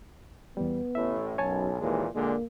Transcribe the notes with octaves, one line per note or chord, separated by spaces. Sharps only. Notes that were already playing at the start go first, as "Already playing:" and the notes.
E2 G3 B3
A1 A2 E5
B1 F#2 C#5 G#5 A5
D#2 A#2 E3 G#3
A#2 D3 G#3 A#3